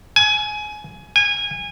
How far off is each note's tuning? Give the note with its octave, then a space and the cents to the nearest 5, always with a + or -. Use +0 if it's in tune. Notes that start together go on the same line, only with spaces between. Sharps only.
G#5 +20
G#5 -25